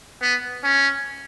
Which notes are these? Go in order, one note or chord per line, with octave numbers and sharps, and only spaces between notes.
B3
C#4